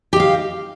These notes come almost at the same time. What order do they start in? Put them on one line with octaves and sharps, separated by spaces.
G4 D#5 F5